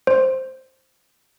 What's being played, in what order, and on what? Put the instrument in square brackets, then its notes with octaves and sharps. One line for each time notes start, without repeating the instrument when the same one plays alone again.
[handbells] C5